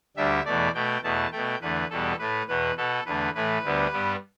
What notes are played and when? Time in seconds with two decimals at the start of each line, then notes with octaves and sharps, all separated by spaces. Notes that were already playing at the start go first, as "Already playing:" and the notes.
0.16 D2 D3 G3 E5
0.45 E2 B2 A3 D5
0.74 B2 A3 G5
1.03 E2 B2 A3 A5
1.32 B2 A3 G5
1.61 E2 D3 A3 B4
1.90 E2 B2 G3 B3 A4
2.19 A2 A3 B4
2.48 E2 B2 B3 B4
2.77 B2 B3 A4
3.06 E2 D3 A3 B4
3.35 A2 E3 A3 B4
3.64 D2 D3 G3 B3
3.92 G2 G3 B3